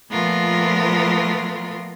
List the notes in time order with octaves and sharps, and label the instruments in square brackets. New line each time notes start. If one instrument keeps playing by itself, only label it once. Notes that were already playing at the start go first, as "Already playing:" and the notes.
[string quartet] A#2 F3 A3 B3 F4 A#4